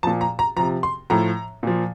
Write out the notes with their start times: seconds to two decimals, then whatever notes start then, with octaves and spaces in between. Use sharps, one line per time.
0.03 A#2 F3 A5
0.21 A#5
0.39 A#5
0.56 C3 F3 A#5
0.83 C6
1.10 A2 F3 A#5
1.63 A#2 F3